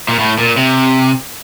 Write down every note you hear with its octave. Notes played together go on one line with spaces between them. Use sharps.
A#2
A2
A#2
C3